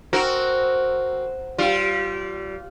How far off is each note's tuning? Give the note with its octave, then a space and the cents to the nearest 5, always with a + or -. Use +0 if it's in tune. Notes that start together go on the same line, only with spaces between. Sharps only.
C4 +0 F#4 +0 A#4 -5
G3 -30 F4 -5